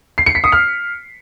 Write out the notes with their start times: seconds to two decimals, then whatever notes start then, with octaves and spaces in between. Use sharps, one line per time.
0.18 C7
0.26 C#7
0.35 B6
0.44 D#6
0.52 F6